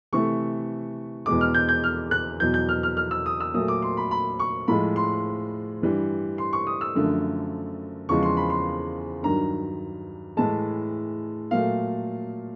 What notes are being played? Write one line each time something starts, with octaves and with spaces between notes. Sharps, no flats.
C3 E3 A3 C#6
E2 B2 G#3 D6
F6
G6
G6
F6
F#6
E2 B2 F#3 G6
G6
F6
F6
F6
E6
D#6
E6
A#2 F#3 A3 D#6
D6
C6
B5
B5
C#6
A2 F3 G#3 B5
C6
G2 E3 G3
C6
C#6
D#6
E6
F#2 D3 F3 A3
E2 C#3 F3 G#3 C#6
C6
B5
C6
G2 D#3 F#3 A#5
A2 E3 G#3 A5
A#2 F#3 A3 F5